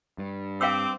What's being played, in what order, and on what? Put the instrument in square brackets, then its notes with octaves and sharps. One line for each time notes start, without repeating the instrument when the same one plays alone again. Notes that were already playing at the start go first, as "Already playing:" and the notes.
[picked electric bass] G2
[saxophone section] C4 [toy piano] F5 G5 E6 [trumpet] D6